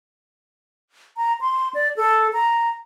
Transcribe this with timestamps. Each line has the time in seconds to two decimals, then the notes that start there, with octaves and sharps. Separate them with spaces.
1.17 A#5
1.41 C6
1.74 D5
1.97 A4
2.33 A#5